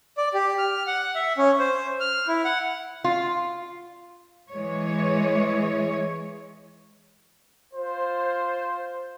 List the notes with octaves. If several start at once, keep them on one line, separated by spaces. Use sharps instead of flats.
D5
G4
F6
F#5
E5
C#4
C5
F6
E4
F#5
F4
E3 G#3 C#5
F4 C5